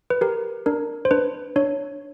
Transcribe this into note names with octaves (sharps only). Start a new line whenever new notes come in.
B4
G4 A#4
D4 A#4
C5
D4 B4
D4 C#5